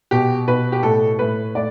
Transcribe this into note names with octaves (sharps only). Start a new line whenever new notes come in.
B2 G4
B2 B4
G4
A2 A4
A2 B4
A2 D5